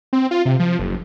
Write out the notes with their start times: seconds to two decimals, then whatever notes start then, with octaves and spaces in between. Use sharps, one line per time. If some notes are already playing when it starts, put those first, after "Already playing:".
0.13 C4
0.31 F4
0.45 C3
0.60 F3
0.79 F#1